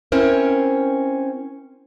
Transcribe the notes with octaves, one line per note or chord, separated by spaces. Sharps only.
C4 C#4 E4 A#4 C5